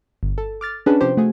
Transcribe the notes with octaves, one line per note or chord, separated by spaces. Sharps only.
G1
A4
D6 F6 A6
C#4 D4 G#4 B4 F#5 A5
C3 F3 G4 C5
A3 F#4 G#4